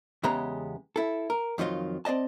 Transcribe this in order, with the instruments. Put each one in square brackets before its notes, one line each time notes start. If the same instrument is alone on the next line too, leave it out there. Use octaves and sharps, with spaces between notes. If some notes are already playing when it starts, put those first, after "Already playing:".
[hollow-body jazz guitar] E2 C#3 G#3 B3 G4 A#5
E4 A4
A#4
F2 D#3 F#3 F4 D#5
C4 D5 D#5 A5